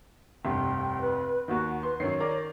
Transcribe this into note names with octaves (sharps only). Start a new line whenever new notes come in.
F1 C2 G2 G5
B4
D#2 D#3 F#4
B4 C6
F#2 D#3 C#5 C7
A#4 D5